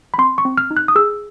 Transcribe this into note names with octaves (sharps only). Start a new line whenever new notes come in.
B5
C4 C6
C#6
C4
F6
D#4
F#6
D#6
G#4 E6